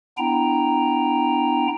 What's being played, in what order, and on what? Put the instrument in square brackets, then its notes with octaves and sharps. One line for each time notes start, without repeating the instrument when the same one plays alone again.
[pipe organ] B3 D4 E4 G5 A#5